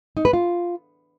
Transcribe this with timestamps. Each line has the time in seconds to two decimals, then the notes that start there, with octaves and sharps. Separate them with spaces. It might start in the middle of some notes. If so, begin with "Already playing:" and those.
0.17 D#4
0.25 B4
0.33 F4